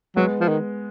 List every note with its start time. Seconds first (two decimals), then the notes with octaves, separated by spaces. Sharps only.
0.16 F#3 G#3 B3
0.40 F3
0.49 D#3